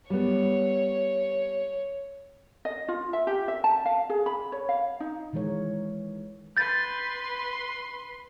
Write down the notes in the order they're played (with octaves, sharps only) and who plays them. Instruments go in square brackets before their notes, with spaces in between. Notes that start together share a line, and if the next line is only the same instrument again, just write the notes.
[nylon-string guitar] G3 B3 [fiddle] C#5
[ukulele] D#5
F4
E5
G4
E5
A5
F5
G#4
B5
C#5
F5
D#4
[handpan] D#3 E3 G#3 A#4 C#5
[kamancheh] B4 C6 [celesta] G6 A6